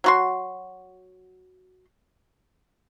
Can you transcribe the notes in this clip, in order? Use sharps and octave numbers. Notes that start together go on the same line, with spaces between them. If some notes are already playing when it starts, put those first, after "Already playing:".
F#3 F#4 C6